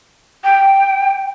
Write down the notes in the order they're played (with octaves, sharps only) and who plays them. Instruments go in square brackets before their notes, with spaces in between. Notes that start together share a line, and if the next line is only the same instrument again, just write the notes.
[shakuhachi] G5